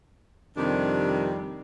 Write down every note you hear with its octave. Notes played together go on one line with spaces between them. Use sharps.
F2 C3 D#3 G3 D4